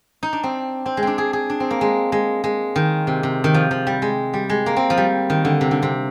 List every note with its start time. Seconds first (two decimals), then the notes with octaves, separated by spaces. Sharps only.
0.23 D#4
0.33 D4
0.43 C4
0.86 C4
0.97 G#3
1.03 C4 D4
1.18 G#4
1.33 G#4
1.50 D4
1.60 C4
1.71 A#3
1.81 G#3
2.12 G#3
2.44 G#3
2.76 D#3
3.07 C3
3.23 C3
3.44 D#3
3.54 F3
3.71 F3
3.87 G3
4.02 G#3
4.34 G3
4.50 G#3
4.66 A#3
4.76 C4
4.90 F3
4.97 G3
5.30 D#3
5.45 D3
5.61 C3
5.71 D3
5.82 C3